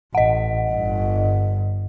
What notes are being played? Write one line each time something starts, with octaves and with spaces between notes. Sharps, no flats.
A1 D#5 F#5
G1 G2